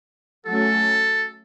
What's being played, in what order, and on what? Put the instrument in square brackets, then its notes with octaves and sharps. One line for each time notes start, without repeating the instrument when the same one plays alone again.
[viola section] F#3 A3 C#4 [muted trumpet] A4